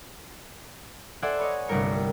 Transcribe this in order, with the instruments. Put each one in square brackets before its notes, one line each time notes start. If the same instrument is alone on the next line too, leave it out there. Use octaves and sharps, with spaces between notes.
[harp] A4 C5 D5 E5 F#5 G#5
B4 C#5 D#5
G1 C2 G3 A3 A#4 C#7